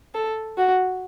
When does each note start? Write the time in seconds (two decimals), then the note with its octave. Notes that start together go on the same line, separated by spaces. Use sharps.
0.15 A4
0.58 F#4